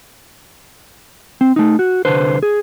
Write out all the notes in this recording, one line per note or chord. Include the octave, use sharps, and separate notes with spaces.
C4
A3 D#4
F#4
C2 D3 B4 C5
G#4